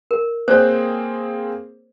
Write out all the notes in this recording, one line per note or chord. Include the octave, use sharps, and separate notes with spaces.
A#4
A#3 C4 G#4 C5 C#5